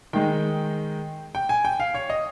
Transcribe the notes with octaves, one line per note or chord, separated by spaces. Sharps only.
D#3 G#3 D#4 G5
G5
G#5
G5
F5
C#5
D#5